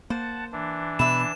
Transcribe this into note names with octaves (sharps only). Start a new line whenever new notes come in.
A#3 C5 F#5 A5
E3 D4
B2 B4 E5 E7